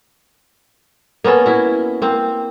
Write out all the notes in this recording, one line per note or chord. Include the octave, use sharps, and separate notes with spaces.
A#3 B3 C#4 A4
E4 F#4
A#3 C4